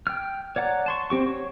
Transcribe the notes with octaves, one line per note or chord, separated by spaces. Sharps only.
G5 F6
C#5 D5 F#5 A#5
A5 C6 C#6
C4 G4 C#6
C#5